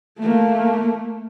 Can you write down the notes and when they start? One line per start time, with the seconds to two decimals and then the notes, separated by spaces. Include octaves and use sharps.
0.19 A3 A#3